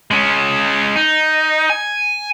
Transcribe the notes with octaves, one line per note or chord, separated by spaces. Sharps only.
G#3 C#4
D#4
G#5